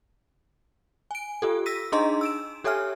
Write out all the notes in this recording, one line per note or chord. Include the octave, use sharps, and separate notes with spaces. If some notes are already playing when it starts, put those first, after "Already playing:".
G#5 D7
F4 G4 A4
E6 A#6 B6 D#7
D4 D#4 G#4 D#5 A#5 C6
E6 D7 E7
G4 A4 C#5 E5 G#5 F6